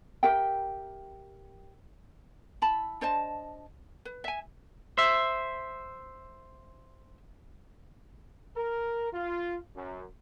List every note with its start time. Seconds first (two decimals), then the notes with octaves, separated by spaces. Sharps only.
0.23 G4 A#4 E5 G5
2.62 E4 A5 B5
3.01 D4 C5 D#5 A5
4.05 B4
4.24 E5 G#5
4.98 C5 E5
8.56 A#4
9.13 F4
9.76 F#2